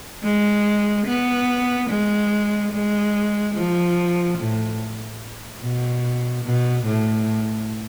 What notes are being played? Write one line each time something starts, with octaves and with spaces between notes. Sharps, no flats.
G#3
B3
G#3
G#3
F3
A2
B2
B2
A2